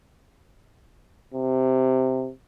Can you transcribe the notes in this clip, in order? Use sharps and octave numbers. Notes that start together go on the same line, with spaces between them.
C3